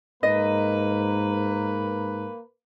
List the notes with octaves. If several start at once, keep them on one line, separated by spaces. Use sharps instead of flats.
G#2 A#3 A#4 B4 D#5